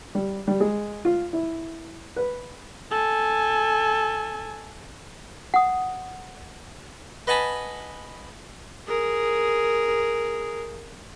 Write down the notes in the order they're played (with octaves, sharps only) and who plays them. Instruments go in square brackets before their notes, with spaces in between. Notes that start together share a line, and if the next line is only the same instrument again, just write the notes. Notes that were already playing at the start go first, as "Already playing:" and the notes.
[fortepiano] G3
G3
G#3
F4
E4
B4
[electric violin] A4 G#5
[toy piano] F#5 D#6
[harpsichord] B4 D#5 F#5 G#5 A5 B5
[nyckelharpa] G#4 A#4